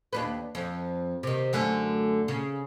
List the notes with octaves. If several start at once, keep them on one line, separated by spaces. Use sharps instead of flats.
D#2 D4 B4
F2
C3 D#3
F#2 D3 A3
C#3